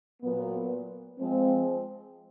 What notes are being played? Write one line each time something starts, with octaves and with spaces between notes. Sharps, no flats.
A#2 F#3 B3
F3 G#3 C4